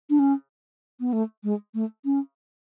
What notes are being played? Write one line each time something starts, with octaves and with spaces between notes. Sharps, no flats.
D4
C#4
B3
A3
G#3
A3
C#4